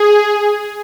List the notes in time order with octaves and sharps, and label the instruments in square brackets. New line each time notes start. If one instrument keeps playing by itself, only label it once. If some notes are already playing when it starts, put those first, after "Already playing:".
Already playing: [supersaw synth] G#4